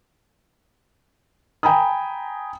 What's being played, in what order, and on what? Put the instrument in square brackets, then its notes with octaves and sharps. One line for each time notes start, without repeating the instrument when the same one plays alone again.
[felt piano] G5 G#5 A#5 B5 D#6